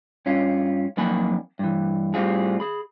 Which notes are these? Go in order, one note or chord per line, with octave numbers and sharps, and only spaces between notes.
G2 C#4 F4
F2 D#3 F#3 A#3 G#5 B5
G2 E3
A2 G3 C4 F4 G#4
G#4 B5